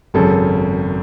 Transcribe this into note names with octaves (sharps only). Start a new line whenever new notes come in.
G#1 F#2 C#3 A4